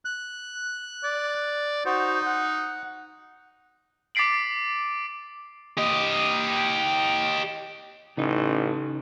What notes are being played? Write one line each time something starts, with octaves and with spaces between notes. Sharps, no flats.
F#6
D5
D#4 F#4 C5
F#5
D6 A6 B6 C7 D7 F#7
G4 D#5
A1 C#3 D#4